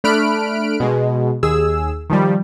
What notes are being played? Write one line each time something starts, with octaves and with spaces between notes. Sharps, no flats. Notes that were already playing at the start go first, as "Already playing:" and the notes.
A3 D4 B5 F6 F#6 D7
B2 G#3
D#2 G#4 E6
D#3 F3 G3